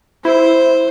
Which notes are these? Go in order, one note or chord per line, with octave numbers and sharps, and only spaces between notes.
E4 C5